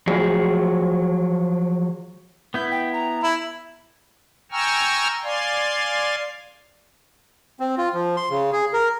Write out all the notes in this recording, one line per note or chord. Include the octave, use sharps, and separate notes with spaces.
F3 F#3 G#4
B3 E4 G6
G5
A#5
E4
G5 G#5 A#5 C#6 E6 F6
D5 F5 G#5 C6
C4
F4
F3
C6
C#3
G#4
A#4